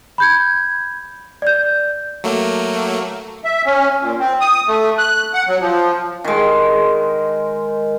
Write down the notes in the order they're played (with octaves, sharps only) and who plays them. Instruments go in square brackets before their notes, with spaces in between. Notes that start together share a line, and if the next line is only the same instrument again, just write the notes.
[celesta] B5 G6 G#6
D5 G6
[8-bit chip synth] F#3 A3 A#3
[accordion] E5
C#4
A#2
C4
D#6
A3
F#6
F#5
F#3
F3
[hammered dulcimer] D#3 G#3